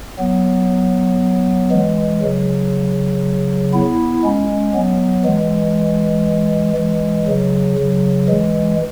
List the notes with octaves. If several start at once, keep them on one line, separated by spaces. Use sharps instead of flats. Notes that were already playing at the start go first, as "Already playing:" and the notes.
F#3 B3
E3 G#3
C#3 F#3
B3 E4
G#3 C#4
F#3 B3
E3 G#3
E3 G#3
C#3 F#3
C#3 F#3
E3 G#3